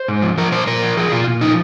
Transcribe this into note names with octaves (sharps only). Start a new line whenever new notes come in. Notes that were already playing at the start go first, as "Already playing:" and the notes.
Already playing: C5
G#2
F3
F3 A#4
A#2 C5
A#2 A#4
F3
F3 G#4
A#2 F4
A#2
F3 D#4